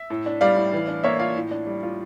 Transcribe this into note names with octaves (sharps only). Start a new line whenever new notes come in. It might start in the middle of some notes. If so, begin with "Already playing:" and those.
Already playing: E5
A2
D4
G3 D5 F5
A2
E3
D4
A#3 C#5 E5
F4 D5 F5
A2
D4
G3
F4